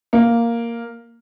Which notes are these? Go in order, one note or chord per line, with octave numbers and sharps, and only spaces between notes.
A#3